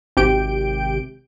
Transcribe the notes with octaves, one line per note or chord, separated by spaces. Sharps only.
G#1 C3 G4 G6 D7